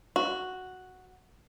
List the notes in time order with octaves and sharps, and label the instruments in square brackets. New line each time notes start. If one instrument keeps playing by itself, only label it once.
[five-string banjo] F#4